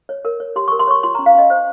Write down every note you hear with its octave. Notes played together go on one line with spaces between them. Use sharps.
C#5
A#4
C#5
G4 C6
A#4 C#6
C6
C#5 C#6
F4 C6
C#4 A#5
F5
C#4 D#5
C5